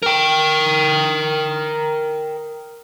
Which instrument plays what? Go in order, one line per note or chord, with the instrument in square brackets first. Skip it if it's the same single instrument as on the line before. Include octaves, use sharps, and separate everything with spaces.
[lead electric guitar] A#4 G5